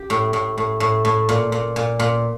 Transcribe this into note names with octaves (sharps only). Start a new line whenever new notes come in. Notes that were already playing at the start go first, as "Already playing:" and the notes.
Already playing: G4
A2
A2
A2
A2
A2
A#2
A#2
A#2
A#2